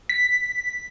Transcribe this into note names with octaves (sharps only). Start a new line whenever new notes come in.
B6